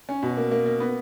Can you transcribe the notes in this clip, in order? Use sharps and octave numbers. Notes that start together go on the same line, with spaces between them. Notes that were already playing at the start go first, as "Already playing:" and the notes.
C#4
B2
A#3
A#3
A#3
B3